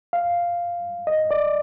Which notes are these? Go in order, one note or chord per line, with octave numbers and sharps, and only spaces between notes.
F5
D#5
D5